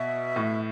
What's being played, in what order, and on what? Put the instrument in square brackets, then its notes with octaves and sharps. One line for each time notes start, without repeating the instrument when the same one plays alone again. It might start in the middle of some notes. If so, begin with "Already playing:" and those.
Already playing: [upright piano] B2 [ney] E5
[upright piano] A2